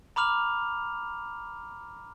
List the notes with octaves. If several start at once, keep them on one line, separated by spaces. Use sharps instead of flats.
A#5 B5 D6 F6 F7